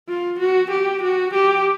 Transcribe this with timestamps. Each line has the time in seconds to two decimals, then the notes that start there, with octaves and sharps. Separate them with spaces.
0.09 F4
0.40 F#4
0.71 G4
1.03 F#4
1.34 G4